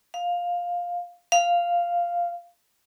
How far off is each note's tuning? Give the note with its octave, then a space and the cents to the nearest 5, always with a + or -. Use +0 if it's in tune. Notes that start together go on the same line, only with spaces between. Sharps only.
F5 +10
F5 -5